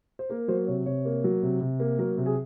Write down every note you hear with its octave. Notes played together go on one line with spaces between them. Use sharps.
C5
A#3 A#4
F#3 C5
C3 C#5
C3 C#5
A#3
F#3
C3
C3
A#3
F#3 A#4
C3
G#4